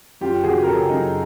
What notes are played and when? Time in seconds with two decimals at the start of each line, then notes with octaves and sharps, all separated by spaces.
0.21 F#2 F4 G4
0.44 C#3 F#4 G#4
0.63 A#4
0.67 C#3 G4 A4
0.89 F#2 D#4